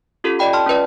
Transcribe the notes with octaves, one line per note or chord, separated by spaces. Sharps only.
C#4 F4 G4 A4
D5 D#5 G5 B5
A5 C6 F6
C#4 F4 B4 D5